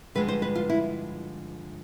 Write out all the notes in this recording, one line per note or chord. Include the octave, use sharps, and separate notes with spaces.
G2 D3 F3 G#3 B4
C5
B4
F4
E4